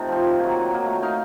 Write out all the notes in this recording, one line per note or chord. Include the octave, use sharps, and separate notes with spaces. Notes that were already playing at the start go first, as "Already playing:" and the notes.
Already playing: C3 A3 D#4 A4
F3 C4
D#3
F#3 A#3
D#3
F#3 A#3
A3
D#4 A#4 F5